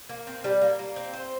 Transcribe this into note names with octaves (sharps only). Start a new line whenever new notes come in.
A#3
C4
G3
A#3
A#3
C4
C5